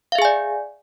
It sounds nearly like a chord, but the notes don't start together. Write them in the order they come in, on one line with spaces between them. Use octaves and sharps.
F5 E5 G#4 G#5 D5